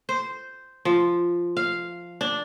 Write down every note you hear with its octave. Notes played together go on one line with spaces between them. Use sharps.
C5
F3
F5
D4